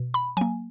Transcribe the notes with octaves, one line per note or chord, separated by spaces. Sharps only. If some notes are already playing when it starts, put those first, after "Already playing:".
Already playing: B2
B5
F#3 A#3 G#5